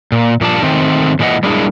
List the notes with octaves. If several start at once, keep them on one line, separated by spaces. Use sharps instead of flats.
A#2
A#2 F3 G3 D4 A#4 A5
D#3 A3 C4
A#2 E3 G#3 F#4 D#5 F#5
G3 G#3 A#3 D4 E4 G#4